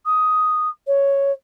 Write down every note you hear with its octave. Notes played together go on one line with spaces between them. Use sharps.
D#6
C#5